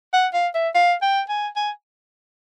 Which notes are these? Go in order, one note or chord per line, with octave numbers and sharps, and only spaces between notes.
F#5
F5
E5
F5
G5
G#5
G#5